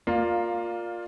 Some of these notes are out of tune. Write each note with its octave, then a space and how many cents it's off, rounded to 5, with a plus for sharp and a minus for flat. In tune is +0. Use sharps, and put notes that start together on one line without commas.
A#3 +0 F4 +15 D5 +20